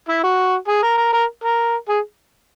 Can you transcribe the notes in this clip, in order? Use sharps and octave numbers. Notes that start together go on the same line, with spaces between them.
E4
F#4
G#4
A#4
A#4
A#4
A#4
G#4